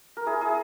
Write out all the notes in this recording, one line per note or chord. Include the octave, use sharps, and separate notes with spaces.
A#4
E4 G#4
E4 G#4